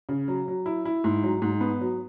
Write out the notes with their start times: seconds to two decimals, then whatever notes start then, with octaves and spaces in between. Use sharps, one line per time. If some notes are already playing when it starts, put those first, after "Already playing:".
0.09 C#3
0.28 F#3
0.48 F#3
0.66 E4
0.85 E4
1.04 G#2
1.23 F#3
1.42 G#2
1.61 B3
1.81 F#3